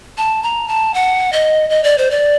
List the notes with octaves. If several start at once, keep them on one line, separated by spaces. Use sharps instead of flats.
A5
A#5
A5
F#5
D#5
D#5
D5
C5
D5